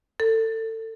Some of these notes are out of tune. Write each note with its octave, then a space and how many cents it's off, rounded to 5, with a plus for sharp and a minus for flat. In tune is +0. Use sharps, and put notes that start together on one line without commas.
A4 +25